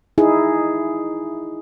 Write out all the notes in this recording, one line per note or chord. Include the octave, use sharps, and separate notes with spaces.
D#4 E4 G#4